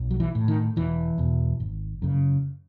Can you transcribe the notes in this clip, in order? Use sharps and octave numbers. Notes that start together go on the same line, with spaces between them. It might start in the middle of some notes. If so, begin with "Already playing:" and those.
Already playing: B1
F#3
E3
A2
D#3
E1 E3
E2 B2
G#1
F#2 C#3